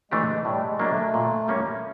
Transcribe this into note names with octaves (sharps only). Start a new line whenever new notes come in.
E3 G#3 A3 D4 G4
A2 G3
G#3
F#3 A#3 D4
A3
A#2
G3 A#3 C#4